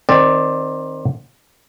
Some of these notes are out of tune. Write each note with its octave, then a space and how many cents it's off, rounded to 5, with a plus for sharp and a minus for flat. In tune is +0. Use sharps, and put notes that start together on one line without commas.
D#3 +0 C4 +20 D5 +0